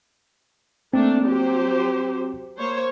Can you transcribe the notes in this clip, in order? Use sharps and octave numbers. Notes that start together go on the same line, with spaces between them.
A3 A#3 C4 D4
F#3 G4 C5
A#3 C5 C#5